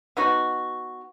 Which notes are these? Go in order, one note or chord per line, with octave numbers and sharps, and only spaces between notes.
B3 D#4 F#4